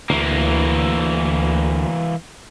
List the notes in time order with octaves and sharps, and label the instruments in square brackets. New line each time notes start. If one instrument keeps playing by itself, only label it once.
[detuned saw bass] D2 [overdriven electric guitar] E3 A#3